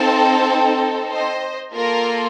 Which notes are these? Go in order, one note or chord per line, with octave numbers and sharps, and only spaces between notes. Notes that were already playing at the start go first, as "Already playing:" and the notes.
Already playing: C4 D#4 A4 F5 A5
C5 D#5
A#3 F4 A4 A#4